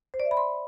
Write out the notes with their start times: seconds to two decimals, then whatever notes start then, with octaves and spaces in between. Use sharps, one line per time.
0.14 C5
0.20 D5
0.25 E5
0.31 B5
0.37 C6